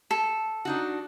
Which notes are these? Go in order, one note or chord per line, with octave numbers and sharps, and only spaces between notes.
A4
D4 D#4 F#4